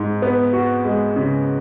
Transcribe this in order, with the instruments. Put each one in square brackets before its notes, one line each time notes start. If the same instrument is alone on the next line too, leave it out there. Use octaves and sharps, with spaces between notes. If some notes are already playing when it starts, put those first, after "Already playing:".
Already playing: [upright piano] G#2
B3
F#4
G#3
C#3